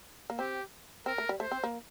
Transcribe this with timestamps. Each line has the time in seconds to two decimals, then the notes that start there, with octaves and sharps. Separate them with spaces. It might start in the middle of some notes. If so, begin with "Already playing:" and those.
0.30 A#3
0.39 C4 G4
1.06 C4 A#4
1.18 A3
1.29 G3
1.40 A3 C5
1.52 C4
1.64 A#3